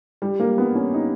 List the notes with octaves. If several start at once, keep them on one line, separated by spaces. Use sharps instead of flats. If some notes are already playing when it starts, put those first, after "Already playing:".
G3
A#3
B3
C#4
D#4